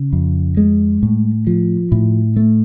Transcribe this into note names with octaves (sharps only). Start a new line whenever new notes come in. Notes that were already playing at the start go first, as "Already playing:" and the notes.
Already playing: C#3
F2
G#3
A2
F3
A2
A3